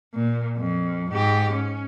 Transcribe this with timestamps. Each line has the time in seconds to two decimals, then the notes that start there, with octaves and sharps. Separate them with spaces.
0.14 A#2
0.58 F2
1.11 G#2 G4
1.52 C#4